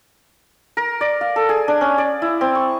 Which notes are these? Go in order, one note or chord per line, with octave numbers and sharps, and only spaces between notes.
A#4
D5
F5
A4
G#4
D4
C#4
D5
E4
C4
C#6